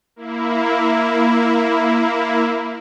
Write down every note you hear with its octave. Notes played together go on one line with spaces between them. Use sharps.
A#3 E4